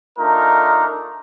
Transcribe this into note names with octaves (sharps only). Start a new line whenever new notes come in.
A3 D4 D#4 F4 A#4